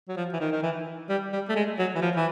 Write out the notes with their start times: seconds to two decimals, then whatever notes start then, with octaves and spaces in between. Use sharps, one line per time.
0.09 F#3
0.17 F3
0.33 E3
0.40 D#3
0.52 D#3
0.63 E3
1.10 G3
1.33 G3
1.49 A3
1.56 G#3
1.79 F#3
1.95 E3
2.02 F3
2.16 E3